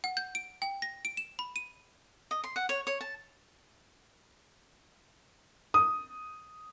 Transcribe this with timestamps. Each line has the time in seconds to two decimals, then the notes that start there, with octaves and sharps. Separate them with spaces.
0.04 F#5
0.17 G6
0.35 D7
0.62 G5
0.82 A#6
1.05 D7
1.17 E7
1.39 B5
1.56 D#7
2.31 D#5
2.44 C6
2.56 F#5
2.69 C#5
2.87 C#5
3.01 A5
5.74 D#6